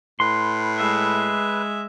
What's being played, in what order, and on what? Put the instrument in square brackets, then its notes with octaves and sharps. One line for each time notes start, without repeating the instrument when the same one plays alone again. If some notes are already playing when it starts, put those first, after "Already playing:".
[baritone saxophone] A2 [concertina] B4 [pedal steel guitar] C6
[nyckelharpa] G#3 E5